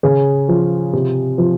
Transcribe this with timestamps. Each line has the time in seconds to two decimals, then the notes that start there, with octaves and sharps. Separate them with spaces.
0.03 C#3 G#4
0.49 F3
0.93 C3
1.38 F3